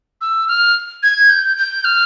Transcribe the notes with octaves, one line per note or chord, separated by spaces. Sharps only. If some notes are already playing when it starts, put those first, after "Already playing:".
E6
F6
G#6
G6
G6
F6